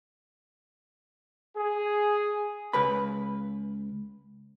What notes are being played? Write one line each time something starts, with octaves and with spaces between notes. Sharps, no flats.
G#4
C#2 B4 B5